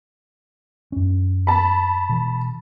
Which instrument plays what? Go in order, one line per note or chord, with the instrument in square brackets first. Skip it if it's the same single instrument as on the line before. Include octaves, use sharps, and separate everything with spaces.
[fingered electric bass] F#2 C#4
[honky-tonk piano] A5 B5
[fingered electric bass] B2 E3